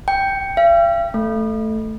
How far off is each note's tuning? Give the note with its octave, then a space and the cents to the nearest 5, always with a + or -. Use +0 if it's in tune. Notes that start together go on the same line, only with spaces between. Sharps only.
G5 +0
F5 -45
A3 +0